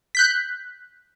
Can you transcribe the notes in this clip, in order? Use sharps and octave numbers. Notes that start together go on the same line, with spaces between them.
F#6 G6 B6